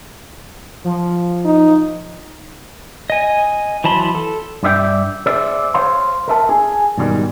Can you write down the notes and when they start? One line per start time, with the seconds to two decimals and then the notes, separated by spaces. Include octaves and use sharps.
0.84 F3
1.45 D#4
3.10 D#5 G#5
3.84 E3 F#3 A5 B5 C6
4.15 A4
4.63 G2 G3 D5 E5 G5
5.26 G#4 C5 D5 E5
5.74 C5 C#5 F5 C6
6.28 A#4 E5 A5
6.49 G#4
6.98 G#2 B2 D#3 G3